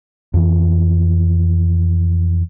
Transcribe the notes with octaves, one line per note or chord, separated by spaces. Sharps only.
F2 E3